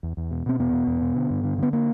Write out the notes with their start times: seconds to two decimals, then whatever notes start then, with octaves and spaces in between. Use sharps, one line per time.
0.03 E2
0.17 E2
0.31 B2
0.46 B2 C4
0.59 E2 B3
0.73 B2
0.87 E2
1.01 B2
1.16 D3
1.30 G2
1.44 D3
1.58 D3 B3
1.73 A#3